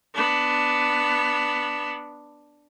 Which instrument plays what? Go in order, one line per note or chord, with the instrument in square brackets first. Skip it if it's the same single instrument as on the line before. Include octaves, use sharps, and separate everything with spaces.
[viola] B3 D4